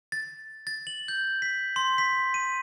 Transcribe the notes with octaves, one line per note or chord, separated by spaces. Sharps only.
A6
A6
F#7
G6
B6
C6
B6
D#7